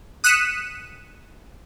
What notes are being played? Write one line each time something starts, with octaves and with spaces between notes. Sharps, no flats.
D#6 F#6 B6 C#7 D#7 E7